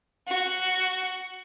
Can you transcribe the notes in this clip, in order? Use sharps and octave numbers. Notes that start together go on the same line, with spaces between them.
F#4